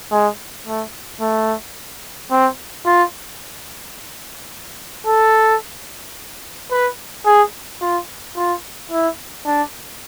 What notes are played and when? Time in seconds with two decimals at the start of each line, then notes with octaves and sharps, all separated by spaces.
0.11 G#3
0.66 A3
1.21 A3
2.31 C4
2.86 F4
5.06 A4
6.71 B4
7.26 G#4
7.81 F4
8.36 F4
8.91 E4
9.46 D4